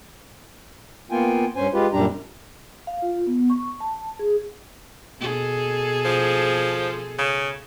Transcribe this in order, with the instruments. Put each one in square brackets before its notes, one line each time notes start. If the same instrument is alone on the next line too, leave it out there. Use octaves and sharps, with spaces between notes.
[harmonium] A#3 B3 F4 G5 G#5
G2 C#4 C5 G#5
G#3 F4 G4 B4
F#2 A#2 G3 D4 G4 A#5
[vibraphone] F5
F4
B3
C#6
A5
G#4
[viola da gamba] B2 G#4 A4
[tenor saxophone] F3
C#3